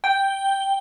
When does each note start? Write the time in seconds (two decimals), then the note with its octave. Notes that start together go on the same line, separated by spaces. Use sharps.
0.04 G5